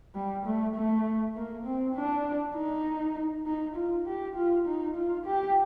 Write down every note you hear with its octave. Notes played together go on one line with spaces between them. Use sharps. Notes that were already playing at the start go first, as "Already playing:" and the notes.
G3
A3
A3
A#3
C4
D4
D#4
D#4
F4
G4
F4
D#4
F4
G4